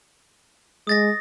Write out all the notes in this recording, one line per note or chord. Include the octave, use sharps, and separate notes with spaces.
G#3 D#6 A6 A#6